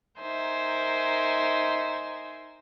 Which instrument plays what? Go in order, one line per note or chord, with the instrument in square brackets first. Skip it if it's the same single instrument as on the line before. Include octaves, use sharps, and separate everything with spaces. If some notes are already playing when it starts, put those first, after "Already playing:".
[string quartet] D#4 A#4 C5 E5 G#5